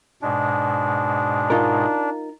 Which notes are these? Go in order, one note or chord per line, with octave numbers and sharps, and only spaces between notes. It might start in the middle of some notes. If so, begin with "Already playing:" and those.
G#2 B2 G#3 D4
D#4 F4 A#4